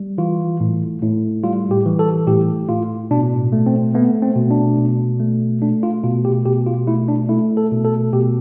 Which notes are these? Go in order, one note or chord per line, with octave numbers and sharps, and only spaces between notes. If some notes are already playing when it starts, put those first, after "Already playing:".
Already playing: G3
E3 F4
A2
A2
G3 F4
G4
E3
A4
A2 G4
A2 F4
B2 D4
A3
C4
A3 B3
C4
B2
D4
B2
A3
A3 D4
F4
B2 F4
G4
B2 G4
F4
A3 E4
D4
A3 E4
A4
B2
A4
B2 G4